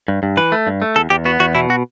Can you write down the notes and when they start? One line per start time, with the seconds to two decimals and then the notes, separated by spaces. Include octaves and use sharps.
0.08 G2
0.23 G2
0.37 E3 B4
0.52 A3
0.67 G2
0.82 A3
0.96 E2 A4
1.10 E2 G4
1.25 B3 F#4
1.40 E2 F#4
1.55 B2 E4
1.70 F#4